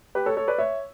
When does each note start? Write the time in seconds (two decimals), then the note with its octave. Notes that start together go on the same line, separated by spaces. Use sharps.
0.15 G4 B4
0.26 A4 C#5
0.37 A4 C#5
0.48 B4 D5
0.58 C#5 E5